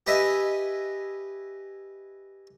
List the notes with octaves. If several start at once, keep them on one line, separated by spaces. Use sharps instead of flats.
G4 B4 D#5 E5 G#5